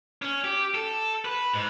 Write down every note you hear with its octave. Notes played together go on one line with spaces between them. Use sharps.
C#4
G4
A4
B4
G#2